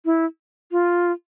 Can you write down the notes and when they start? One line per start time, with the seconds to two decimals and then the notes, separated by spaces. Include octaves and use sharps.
0.05 E4
0.72 F4